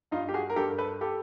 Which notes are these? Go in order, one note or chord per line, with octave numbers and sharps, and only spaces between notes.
G2 D#4 F4
G4
F#4 G#4
A#4
G2 G4 A4
A#4
A4 B4
G4 A4